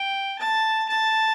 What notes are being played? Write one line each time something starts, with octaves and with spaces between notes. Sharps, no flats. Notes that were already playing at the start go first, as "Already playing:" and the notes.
Already playing: G5
A5
A5